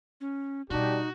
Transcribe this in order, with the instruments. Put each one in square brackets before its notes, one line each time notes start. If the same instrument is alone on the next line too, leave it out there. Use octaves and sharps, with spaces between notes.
[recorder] C#4
[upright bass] B2 G3 [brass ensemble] D4 G4 [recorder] D#4 [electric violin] F#4